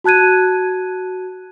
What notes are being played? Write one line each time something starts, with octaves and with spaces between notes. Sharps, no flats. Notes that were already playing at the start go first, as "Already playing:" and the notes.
F#4 A5 F#6 G#6 D#7